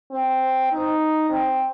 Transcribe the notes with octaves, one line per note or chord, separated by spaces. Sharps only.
C4
D#4
C4